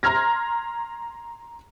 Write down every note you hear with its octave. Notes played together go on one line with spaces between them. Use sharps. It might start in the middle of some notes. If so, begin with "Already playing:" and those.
A#5 C6 F6 G#6 A#6